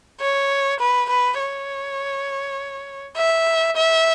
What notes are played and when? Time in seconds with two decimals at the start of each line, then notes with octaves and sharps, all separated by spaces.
0.21 C#5
0.80 B4
1.09 B4
1.40 C#5
3.17 E5
3.76 E5